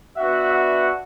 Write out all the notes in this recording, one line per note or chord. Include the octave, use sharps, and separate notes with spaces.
B3 D4 F#4 E5 F#5
E5 F#5